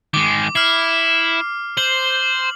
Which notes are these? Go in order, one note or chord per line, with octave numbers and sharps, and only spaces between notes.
D#3 G#3 D6
E4 F6 C7
C5 F#7